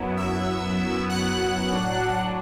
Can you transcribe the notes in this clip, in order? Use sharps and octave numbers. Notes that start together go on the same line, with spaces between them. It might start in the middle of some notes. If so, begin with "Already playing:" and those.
Already playing: F#2 F#3 B3 E4
E5 E6
F#5 F#6
A2 F#3 D4